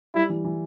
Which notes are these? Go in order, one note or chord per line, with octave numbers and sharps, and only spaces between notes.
G3 E4
E3
E3